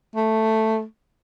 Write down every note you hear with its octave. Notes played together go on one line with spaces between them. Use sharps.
A3